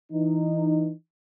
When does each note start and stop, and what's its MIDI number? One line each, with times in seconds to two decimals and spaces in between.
0.12 0.91 52
0.12 0.91 63